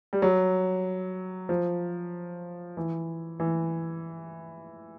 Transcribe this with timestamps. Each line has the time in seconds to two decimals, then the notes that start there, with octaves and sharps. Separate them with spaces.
0.13 G3
0.22 F#3
1.49 F3
2.77 E3
3.40 E3